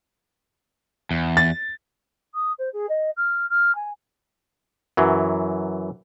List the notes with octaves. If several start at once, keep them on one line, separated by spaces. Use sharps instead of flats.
E2
A6
D#6
C5
G#4
D#5
F6
F6
G#5
F#2 E3 F#3